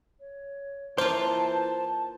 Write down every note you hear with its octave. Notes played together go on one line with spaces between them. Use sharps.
C#5
E3 A#3 F4 C5 A5